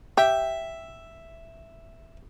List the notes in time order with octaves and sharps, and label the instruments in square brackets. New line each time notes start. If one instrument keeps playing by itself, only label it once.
[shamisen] G4 [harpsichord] E5